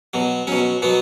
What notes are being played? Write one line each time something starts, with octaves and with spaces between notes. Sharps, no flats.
B2 F#3
B2 F#3 C#4
B2 F#3 B3